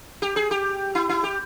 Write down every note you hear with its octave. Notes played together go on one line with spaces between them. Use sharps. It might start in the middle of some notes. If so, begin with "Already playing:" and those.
G4
G#4
G4
E4
E4
G4